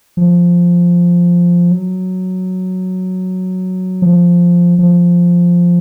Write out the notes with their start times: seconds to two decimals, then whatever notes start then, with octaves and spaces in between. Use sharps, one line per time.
0.17 F3
1.71 F#3
4.02 F3
4.79 F3